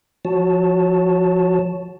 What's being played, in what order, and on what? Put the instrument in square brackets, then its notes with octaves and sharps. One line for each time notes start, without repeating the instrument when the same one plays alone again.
[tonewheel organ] F3 F#4 C#5 A5